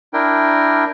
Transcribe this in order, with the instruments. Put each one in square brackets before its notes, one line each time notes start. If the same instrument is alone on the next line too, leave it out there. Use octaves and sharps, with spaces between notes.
[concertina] D4 E4 A#4 G5